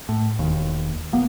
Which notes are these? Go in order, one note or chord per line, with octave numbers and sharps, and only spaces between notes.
A2
E1 D#2
D#1 A#3 B3